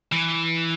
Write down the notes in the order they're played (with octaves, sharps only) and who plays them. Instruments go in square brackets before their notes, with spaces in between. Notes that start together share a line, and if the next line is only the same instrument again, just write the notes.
[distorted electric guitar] E3